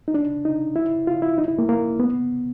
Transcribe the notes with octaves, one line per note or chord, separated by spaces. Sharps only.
D#4
D4
D#4
E4
F4
E4
D#4
E4
A#3
A#3
B3